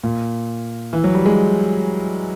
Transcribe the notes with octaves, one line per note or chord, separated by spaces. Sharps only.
A#2
E3
F#3
G3
G#3